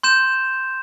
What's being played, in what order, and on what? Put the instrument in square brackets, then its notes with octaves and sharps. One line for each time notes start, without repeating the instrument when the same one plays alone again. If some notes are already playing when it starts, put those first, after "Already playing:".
[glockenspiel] C6 G6 E7